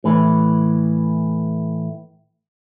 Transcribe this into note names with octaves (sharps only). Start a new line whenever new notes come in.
A2 E3